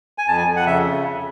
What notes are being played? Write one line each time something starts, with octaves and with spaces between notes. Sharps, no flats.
G#5
F2 A5
G#5
F2
F#5
C#3 E5